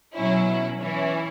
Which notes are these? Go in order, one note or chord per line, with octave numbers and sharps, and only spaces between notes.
B2 F#3 C#4 E4
E3 C#4 E4